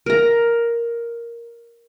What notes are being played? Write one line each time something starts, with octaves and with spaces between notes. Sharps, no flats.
A#4 A#5